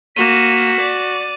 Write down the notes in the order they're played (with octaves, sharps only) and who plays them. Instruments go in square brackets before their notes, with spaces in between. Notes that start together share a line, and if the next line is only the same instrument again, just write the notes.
[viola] A#3 [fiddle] F#4 [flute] B6 [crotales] D#7 E7
[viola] D5